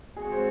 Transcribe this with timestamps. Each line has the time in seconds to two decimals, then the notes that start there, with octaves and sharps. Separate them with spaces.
0.16 G#3 C4 F#4 G#4 C#5
0.32 C5